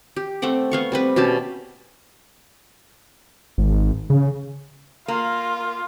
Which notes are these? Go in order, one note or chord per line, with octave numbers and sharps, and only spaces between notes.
G4
A3 C4 F#5 D6
B3 F5 C#6
G3 C4 B4
B2 C#4 G4 A5
G#1
C#3
A#3 F4